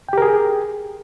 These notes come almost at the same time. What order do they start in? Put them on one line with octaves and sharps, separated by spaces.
G5 G4 A#4 G#4